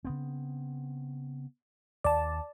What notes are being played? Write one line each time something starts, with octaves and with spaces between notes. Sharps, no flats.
C#3 B3 C4
D#2 D5 A5